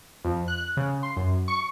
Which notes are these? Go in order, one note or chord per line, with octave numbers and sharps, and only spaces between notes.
F2
F#6
C#3
C6
F#2
C#6